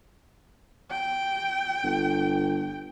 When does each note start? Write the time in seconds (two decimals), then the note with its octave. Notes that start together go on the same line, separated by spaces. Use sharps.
0.91 G5
1.84 G1